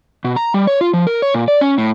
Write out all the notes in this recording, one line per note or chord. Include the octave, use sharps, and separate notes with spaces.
B2
A#5
G3
C#5
F4
F3
A#4
C#5
A#2
D5
C#4
A2